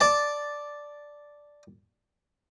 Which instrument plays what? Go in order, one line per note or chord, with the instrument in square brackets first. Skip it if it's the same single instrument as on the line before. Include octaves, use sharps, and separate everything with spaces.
[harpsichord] D5 A5